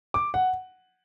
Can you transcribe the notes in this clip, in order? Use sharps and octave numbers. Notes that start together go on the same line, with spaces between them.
D6
F#5